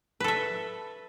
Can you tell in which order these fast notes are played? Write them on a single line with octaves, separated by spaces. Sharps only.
B4 A4 E5